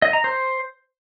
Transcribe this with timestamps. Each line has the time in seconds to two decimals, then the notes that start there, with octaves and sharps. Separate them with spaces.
0.02 D#5
0.13 A#5
0.24 C5